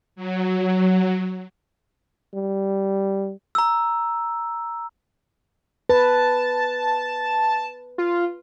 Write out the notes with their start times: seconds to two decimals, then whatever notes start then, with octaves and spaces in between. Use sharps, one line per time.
0.16 F#3
2.36 G3
3.55 A#5 E6
5.89 B4 A5
7.98 F4